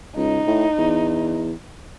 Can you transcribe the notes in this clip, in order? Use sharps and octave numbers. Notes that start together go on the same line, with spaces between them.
C#2 D#4
A2
E2